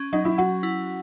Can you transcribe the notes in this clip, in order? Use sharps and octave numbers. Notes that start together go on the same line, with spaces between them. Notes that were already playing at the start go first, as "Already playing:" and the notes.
Already playing: C#4
F#3 D#4
E4
F#3 F#4
E4